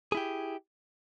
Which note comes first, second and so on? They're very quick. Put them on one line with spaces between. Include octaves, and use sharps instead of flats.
G#4 E4 G4